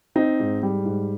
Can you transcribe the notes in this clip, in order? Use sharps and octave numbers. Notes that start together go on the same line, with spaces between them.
C4 D#4
G#2
G3
G#2